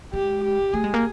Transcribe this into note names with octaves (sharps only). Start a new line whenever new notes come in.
G#3 G4
G4
A3 G#4
G#3
A#3